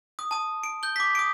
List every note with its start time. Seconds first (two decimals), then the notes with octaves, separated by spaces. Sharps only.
0.19 D#6
0.31 A5 D#6
0.63 D7
0.83 G6 G7
0.96 D6 B6
1.15 D#6 D7